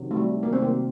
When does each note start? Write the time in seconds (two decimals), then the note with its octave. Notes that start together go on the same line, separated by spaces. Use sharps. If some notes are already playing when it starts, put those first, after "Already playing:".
Already playing: C3 D#3 F#3
0.11 A3
0.17 G3
0.43 A#3
0.53 C4
0.62 A#3